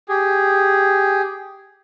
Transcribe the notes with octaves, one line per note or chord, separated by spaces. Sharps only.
G4 G#4